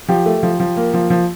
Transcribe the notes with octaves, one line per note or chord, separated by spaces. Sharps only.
F3 G4
A3
F3
F3
A#3
F3
F3